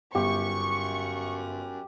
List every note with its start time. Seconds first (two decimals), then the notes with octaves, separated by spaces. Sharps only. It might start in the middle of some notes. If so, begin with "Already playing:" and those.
0.15 G1 F#2 G4 C#6